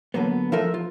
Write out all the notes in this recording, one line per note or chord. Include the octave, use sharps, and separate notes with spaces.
D3 F#3 A#3 B3
F3 A3 F4 A4 A#4 E5
F4